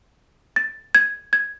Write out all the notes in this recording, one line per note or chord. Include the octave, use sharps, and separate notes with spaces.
A6
G#6
G#6